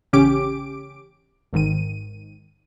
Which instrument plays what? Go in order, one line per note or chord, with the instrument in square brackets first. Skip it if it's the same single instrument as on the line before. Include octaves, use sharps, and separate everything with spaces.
[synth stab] A1 C#3 C#4 G4 D6 D7
G#1 G#2 D#3 D#7